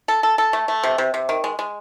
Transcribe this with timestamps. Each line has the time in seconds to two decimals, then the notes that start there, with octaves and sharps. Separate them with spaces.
0.08 A4
0.23 A4
0.38 A4
0.53 A3
0.68 A3
0.83 C3
0.98 C3
1.14 C3
1.29 D#3
1.44 G#3
1.59 G#3